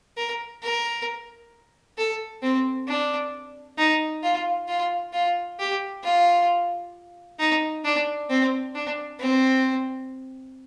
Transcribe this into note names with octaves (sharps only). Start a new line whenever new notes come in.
A#4
A#4
A4
C4
D4
D#4
F4
F4
F4
G4
F4
D#4
D4
C4
D4
C4